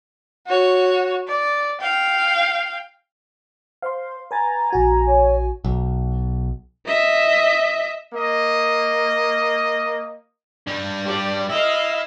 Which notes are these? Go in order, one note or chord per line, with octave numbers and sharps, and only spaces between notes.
F#4 C#5
D5
F5 G5
C5 F5 C6
B4 G#5 A#5 A6
A#1 F#4 G#5
C#5
B1
D#5 E5
A#3 D#5
G2 G3
G4 D5
E4 D#5 F5